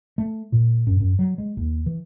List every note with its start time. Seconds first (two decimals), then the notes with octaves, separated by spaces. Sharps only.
0.18 A3
0.52 A#2
0.87 F#2
1.00 F#2
1.19 F#3
1.38 G#3
1.57 D#2
1.86 E3